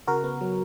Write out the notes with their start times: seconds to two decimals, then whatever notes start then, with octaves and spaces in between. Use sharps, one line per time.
0.07 C#3 F#4 A#4
0.24 B3
0.41 F#3